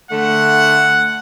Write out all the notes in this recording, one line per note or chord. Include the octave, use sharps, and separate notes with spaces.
D3 A3 F#5